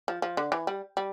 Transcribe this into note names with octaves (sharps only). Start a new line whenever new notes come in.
F3
F3
D3
E3
G3
G3